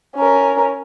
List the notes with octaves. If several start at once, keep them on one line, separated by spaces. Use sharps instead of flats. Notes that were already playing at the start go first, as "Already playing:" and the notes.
C#4 A#4